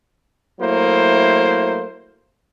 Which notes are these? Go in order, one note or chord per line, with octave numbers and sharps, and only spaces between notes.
F#3 A3 A#3 E4 C5